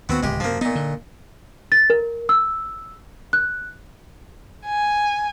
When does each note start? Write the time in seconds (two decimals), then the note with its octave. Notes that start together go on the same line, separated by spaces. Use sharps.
0.09 D#2 B3 C4 F#4
0.23 D1 C#2 G#3 G4
0.40 F#2 C3 F3 A#3
0.61 A#2 B3 D#4
0.75 D3
1.72 A6
1.90 A#4
2.29 E6
3.33 F#6
4.65 G#5